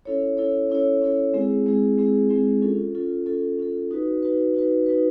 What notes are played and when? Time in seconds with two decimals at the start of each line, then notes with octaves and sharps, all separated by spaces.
0.05 C#4 E4 A4 C#5
0.37 C#4 E4 A4 C#5
0.70 C#4 E4 A4 C#5
1.02 C#4 E4 A4 C#5
1.34 G#3 C4 E4 G#4
1.66 G#3 C4 E4 G#4
1.98 G#3 C4 E4 G#4
2.30 G#3 C4 E4 G#4
2.62 C#4 F4 A4
2.95 C#4 F4 A4
3.26 C#4 F4 A4
3.59 C#4 F4 A4
3.91 D#4 F#4 B4
4.23 D#4 F#4 B4
4.54 D#4 F#4 B4
4.86 D#4 F#4 B4